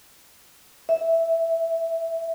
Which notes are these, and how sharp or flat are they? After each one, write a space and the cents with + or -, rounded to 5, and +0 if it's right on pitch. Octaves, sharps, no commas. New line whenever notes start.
E5 -10